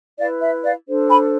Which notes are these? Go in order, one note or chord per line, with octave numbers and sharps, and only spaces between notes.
E4 B4 D5 F5
E5
D5 F5
D4 A4 C5
G#5 B5